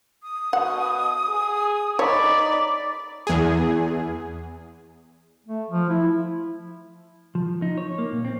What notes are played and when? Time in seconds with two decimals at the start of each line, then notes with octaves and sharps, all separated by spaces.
0.23 D#6
0.53 B2 F#5
1.29 G#4
1.99 D#4 C#5 D5 B5
3.27 E2 G#4
5.46 A3
5.70 F3
5.89 E4
7.35 F3
7.62 D#4
7.78 C#5
7.98 A#3
8.12 A#2
8.25 C4